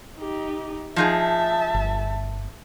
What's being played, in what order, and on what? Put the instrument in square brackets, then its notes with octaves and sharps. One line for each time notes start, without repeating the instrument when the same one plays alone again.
[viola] D#4 G4
[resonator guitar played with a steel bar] F3 D#4 G#4 [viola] E5 A5
[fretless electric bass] G1